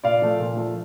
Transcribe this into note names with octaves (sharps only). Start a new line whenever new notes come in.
A#2 D5 F5
F3 A3
A#2
F3 A3